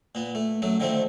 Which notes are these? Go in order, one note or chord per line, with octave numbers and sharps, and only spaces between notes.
A#2 B3
A3
F#2 F#3 A3
D3 D#3 F3 A3 C4